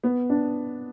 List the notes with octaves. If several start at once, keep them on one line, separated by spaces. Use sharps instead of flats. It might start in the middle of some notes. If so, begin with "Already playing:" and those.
B3
D4